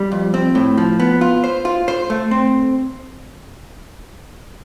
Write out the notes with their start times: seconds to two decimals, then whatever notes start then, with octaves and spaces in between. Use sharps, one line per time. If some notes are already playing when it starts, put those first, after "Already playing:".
Already playing: G3
0.12 F2
0.34 C4
0.55 A2
0.77 F3
1.00 B3
1.21 F4
1.44 C5
1.65 F4
1.88 C5
2.10 A3
2.31 C4